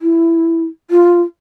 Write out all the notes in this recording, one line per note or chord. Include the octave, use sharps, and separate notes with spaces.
E4
F4